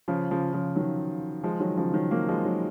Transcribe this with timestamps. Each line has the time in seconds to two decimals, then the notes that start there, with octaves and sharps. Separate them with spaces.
0.08 C#3 F3
0.31 C#3 F3
0.53 C#3 F3
0.75 D#3 F#3
1.44 F3 G#3
1.60 D#3 F#3
1.77 C#3 F3
1.94 D#3 F#3
2.11 F#3 A#3
2.28 F3 G#3
2.45 D#3 F#3